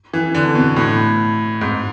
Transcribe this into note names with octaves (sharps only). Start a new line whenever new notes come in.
E3
D3
B2
A2
G#2